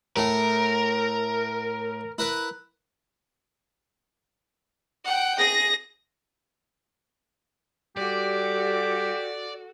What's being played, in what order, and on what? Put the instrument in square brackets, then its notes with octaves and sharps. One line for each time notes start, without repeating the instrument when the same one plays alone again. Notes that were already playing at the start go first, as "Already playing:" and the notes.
[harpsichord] A2 A3 [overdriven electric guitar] A#4
[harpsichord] E4 A#4 B4
[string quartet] F#5 G5
[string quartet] G#4 [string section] A#6
[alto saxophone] G3 [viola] F#4 A4 [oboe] G4 [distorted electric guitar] D5